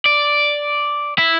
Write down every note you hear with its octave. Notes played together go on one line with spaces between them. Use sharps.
D5
E4